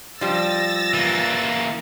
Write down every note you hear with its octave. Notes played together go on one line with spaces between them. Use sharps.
F3 G3 E6 A6 A#6
E3 A#3